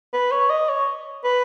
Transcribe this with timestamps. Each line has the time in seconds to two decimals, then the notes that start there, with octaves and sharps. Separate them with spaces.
0.14 B4
0.32 C#5
0.50 D#5
0.69 C#5
1.25 B4